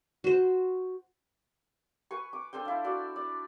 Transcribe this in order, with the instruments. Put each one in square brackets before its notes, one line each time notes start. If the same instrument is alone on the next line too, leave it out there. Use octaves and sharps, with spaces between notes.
[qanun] F#4 C5
[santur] B4 G#5 C#6
D6
D4 A4 C5 G5
E4 F4
E4 F#4 D5
D5